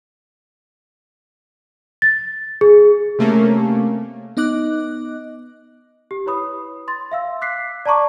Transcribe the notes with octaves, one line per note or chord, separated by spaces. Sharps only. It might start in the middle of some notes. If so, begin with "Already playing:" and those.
A6
G#4
C3 A3 A#3 C#4
B3 D#4 D#5 D6 F#6
G4
E4 B4 C#5 B5 D#6
C6 A6
E5 F5 E6
D6 F#6 B6 C7
D5 A5 A#5 C#6 D6